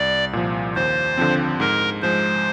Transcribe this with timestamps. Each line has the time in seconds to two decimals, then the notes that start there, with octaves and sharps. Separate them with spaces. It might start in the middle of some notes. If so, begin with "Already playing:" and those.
Already playing: C2 D5
0.33 A#2 F3
0.76 D#2 C5
1.17 D3 F3 C4
1.60 G#2 A#4
2.02 F3 G#3 C5